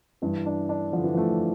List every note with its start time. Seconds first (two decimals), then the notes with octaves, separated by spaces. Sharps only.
0.22 G2 E3
0.46 D4
0.69 D4
0.93 D3 F3
1.04 E3
1.14 F3 A3